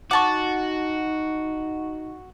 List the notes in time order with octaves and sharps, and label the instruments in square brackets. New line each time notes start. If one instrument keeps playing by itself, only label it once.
[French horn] D#4 [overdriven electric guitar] F#4 [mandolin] F#5 A5 [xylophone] C#6 D6